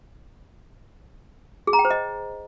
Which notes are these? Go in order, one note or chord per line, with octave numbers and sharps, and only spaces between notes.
G#4
A#5
G5
C5
D#5